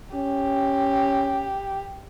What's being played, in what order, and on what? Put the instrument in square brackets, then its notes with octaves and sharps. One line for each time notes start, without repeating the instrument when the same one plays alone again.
[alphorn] C#4 [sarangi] G4